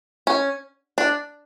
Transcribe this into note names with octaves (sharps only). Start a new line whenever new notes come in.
C#4
D4